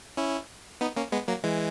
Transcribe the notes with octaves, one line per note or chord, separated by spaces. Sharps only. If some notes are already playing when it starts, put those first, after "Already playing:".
C#4 E4
B3 D#4
A#3 C#4
G#3 B3
F#3 A#3
E3 G#3